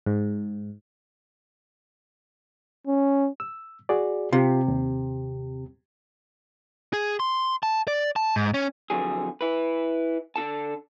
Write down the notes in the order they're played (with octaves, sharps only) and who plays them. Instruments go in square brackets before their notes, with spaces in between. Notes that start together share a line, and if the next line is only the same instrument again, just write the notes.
[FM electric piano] G#2
[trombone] C#4
[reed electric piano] E6
F#4 G#4 D5
[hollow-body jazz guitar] C3 [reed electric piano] F4 G4
[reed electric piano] D#2
[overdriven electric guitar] G#4
C6
A5
D5
A5
G#2
C#4
[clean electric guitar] F2 D3 F#3 G#4
E4 B4
D3 F4 A4 A5